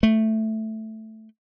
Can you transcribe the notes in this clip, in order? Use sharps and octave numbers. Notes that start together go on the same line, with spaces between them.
A3